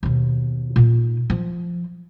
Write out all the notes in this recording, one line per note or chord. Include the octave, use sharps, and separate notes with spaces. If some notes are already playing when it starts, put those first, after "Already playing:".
D#2 B2
A#2 D#4
F3